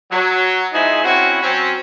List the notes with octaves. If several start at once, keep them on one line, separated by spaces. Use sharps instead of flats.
F#3
F3 G#3 D#4 E4 D#5 G#5
C4 C#4 E4 F#4
F#3 C4 C#4